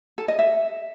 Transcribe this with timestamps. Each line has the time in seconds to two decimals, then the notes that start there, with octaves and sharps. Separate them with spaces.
0.18 A4
0.28 D#5
0.39 E5